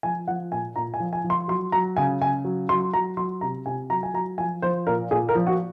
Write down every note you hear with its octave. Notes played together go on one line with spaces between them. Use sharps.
F3 G#5
F3 F#5
A#2 G#5
A#2 A#5
G#5
F3
G#5
F3
C6
F#3 C6
F#3 A#5
C#3 G#5
C#3 G#5
F#3
F#3 C6
F#3 A#5
F#3 C6
C3 A#5
C3 G#5
F#3 A#5
G#5
F#3 A#5
F3 G#5
F3 C5
A#2 A#4
A#2 G#4
A#4
F3
F#4